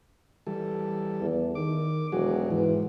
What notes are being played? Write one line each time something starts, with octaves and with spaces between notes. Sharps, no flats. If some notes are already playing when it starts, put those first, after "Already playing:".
E3 G3 A4
E2
D#3 D6
E1 F#3 F#4 G#4
G#2 E3